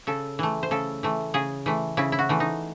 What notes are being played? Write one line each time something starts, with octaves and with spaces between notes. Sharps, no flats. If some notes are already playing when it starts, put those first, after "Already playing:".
C#3 A4
E3 A3
C5
C#3 A4
E3 A3
C#3 G#4
E3 A3
C#3 E4
E4
F#4
E3 A3
D#4